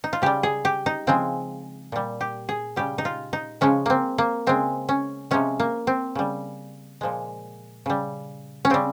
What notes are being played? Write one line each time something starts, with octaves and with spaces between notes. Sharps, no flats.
D#4
F4
C#3 G3 G4
G#4
G4
D#4
C#3 F3 G#3 C4
A#2 G3
G4
G#4
C#3 G3 G4
D#4
F4
D#4
C#3 F3 G#3 C#4
A#3 C4
A#3
C#3 G#3 C4
C#4
C3 F3 G#3 C#4
A#3
C4
C#3 G3
A#2 F3 G#3
C#3 G3
C#4
C#3 G3 C4